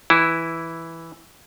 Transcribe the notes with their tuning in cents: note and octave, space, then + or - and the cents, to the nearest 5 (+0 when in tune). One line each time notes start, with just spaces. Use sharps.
E3 +0 E4 +0